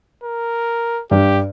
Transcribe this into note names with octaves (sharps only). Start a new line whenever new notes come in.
A#4
G2 G4